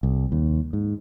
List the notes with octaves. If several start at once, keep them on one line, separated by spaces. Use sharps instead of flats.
C2
D#2
G#2